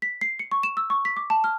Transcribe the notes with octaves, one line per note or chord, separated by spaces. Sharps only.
B6
C7
C#7
C#6
E7
E6
C#6
B6
D6
A5
F6